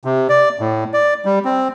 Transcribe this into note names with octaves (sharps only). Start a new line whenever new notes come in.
C3
D5
A2
D5
G3
C4